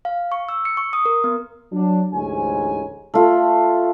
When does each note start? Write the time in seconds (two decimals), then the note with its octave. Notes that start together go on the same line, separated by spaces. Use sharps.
0.05 F5
0.32 C#6
0.49 E6
0.65 C#7
0.77 C#6
0.93 D#6
1.05 A#4
1.24 B3
1.72 F#3 D4
2.13 A1 D2 G#2 C#4 G#5
3.14 A3 F4